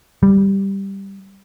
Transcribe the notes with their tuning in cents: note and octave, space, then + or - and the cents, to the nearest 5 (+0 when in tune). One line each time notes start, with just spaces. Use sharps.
G3 +0